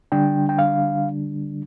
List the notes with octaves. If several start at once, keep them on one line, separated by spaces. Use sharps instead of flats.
D3 G3 D4 G5
G5
F5